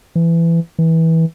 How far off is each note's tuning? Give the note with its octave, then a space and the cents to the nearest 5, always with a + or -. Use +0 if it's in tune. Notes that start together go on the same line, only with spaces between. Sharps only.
E3 +20
E3 -20